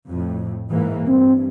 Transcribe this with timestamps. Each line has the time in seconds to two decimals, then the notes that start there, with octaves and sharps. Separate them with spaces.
0.10 F2 A2
0.72 G#2 E3 A#3
1.08 G2 C4